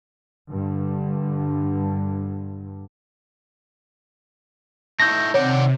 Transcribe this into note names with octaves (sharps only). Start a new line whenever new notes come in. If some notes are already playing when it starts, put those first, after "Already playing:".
G2 D3
A3 D#4 E4 G6 A#6
C3 D#3 C#5 D5 F#5